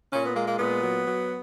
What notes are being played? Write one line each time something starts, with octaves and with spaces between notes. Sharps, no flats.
A#2 C#4
B3
G#3 A#3
A#3
A#2 B3
F#3
F#3